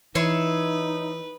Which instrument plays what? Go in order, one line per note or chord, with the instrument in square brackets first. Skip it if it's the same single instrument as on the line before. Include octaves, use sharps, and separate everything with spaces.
[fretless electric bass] E3 [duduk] D#4 [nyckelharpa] B4 [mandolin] C#5 E5 C6